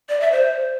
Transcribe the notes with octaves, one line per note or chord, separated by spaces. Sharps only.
D5
E5
C5